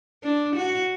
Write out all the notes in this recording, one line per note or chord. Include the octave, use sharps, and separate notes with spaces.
D4
F#4